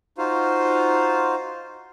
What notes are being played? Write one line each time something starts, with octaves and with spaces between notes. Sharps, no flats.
D#4 F4 F#4 C5 F5